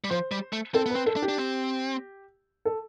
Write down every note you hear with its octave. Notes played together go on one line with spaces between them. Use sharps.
G3
F3 C5
G3
A3
C4 A4
B3
B4
C4
A4
D4
G4
D4
C4
A4